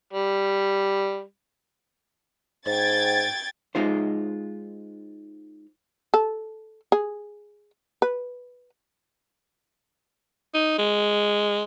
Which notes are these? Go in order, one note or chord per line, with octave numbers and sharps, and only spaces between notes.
G3
G#2 G5 G#6 A6
G#3 D#4 F4 C5
A4
G#4
B4
D#4
G#3